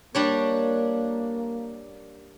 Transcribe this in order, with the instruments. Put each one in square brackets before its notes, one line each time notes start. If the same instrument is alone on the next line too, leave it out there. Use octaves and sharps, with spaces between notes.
[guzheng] G3 D4 C#5 [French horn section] A#3